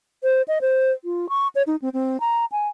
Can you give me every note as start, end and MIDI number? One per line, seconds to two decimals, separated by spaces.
0.23 0.42 72
0.48 0.59 75
0.61 0.92 72
1.05 1.29 65
1.29 1.48 85
1.55 1.62 73
1.67 1.76 63
1.82 1.89 60
1.94 2.20 60
2.20 2.45 82
2.52 2.68 80